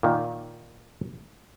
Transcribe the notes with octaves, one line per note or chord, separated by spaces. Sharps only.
A#2 D#3